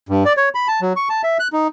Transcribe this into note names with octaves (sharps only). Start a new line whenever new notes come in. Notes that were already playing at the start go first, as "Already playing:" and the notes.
G2
D5
C#5
B5
A5
F#3
C#6
A5
E5
F#6
D#4